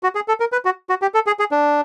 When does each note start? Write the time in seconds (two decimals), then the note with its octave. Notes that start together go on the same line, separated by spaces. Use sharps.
0.03 F#4
0.15 G#4
0.28 A4
0.40 A#4
0.52 B4
0.65 F#4
0.90 F#4
1.02 G4
1.14 A4
1.27 G#4
1.39 G#4
1.51 D4